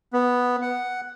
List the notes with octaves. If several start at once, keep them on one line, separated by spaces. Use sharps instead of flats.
B3
F#5